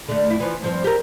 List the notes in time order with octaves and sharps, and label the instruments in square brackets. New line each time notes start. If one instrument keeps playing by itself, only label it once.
[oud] D3 A3
F2 E4
E3 F3
G2 F3 C4
G4 A#4